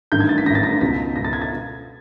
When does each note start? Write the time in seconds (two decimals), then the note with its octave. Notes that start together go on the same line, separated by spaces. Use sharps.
0.12 A1 G2 D#3 G6
0.20 G#6
0.29 A6
0.38 B6
0.46 A1 G2 D#3 A#6
0.55 A6
0.63 A#6
0.81 C#2 B2 B6
1.16 C#2 B2 A#6
1.25 A6
1.33 G#6
1.42 A6